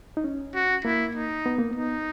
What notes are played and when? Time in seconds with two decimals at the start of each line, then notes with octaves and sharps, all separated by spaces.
0.17 D#4
0.24 C#4
0.55 F#4
0.85 A#3 E4
1.15 D#4
1.46 B3
1.58 A#3
1.71 B3 D#4